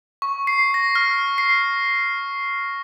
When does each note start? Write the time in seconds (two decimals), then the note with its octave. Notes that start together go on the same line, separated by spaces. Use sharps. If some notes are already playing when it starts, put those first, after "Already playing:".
0.22 C#6
0.47 C7
0.74 A#6
0.95 F6
1.38 C7